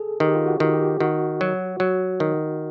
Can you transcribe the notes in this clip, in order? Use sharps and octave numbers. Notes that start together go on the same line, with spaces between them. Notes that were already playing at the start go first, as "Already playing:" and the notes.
Already playing: G#4 A4
D#3 G4
F4
F#4
D#3
G4
D#3 F#4
F#3
F#3
D#3